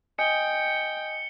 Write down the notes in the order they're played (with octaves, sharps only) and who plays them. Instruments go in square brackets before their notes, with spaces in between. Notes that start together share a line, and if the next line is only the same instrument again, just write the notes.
[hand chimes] D#5 G#5 D#6 [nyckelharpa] G5 [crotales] C#7 G7